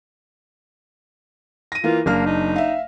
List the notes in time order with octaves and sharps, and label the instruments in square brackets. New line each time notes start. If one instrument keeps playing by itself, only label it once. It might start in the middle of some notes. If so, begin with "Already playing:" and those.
[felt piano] A#6 D#7
[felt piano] E3 A#3 [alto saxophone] F4
[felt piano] F#1 D4 F6 [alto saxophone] A#3
[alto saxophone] D#4
[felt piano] E5 F5